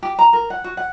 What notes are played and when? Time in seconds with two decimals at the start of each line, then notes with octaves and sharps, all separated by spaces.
0.03 G4
0.19 A#5
0.33 A#4
0.50 F#5
0.64 F#4
0.77 F#5